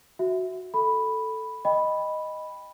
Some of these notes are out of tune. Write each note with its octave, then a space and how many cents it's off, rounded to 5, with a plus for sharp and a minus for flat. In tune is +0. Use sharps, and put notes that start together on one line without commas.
F#4 +0 E5 -5
A4 +0 B5 +0
D#5 +0 G5 +20 B5 +0